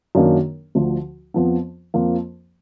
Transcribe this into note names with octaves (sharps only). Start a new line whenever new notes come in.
F#2 D#3 F#3 A#3 D4
D2 D3 F3
F2 F3 B3
F2 F3 A#3